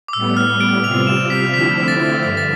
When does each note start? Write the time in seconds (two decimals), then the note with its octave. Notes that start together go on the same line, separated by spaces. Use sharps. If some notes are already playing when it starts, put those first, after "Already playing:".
0.08 D6
0.13 A2 G3 B3 E6
0.37 F6
0.60 D7
0.84 C3 G3 C4 F4 F7
1.07 E7
1.30 B6
1.53 D3 F3 A3 C4 E4 B6
1.88 A6
2.23 G2 D3 A6
2.37 A6